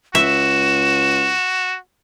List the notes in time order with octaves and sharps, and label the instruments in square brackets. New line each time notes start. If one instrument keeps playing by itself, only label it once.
[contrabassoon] C#2 [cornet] F#4 [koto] E5 [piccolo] E7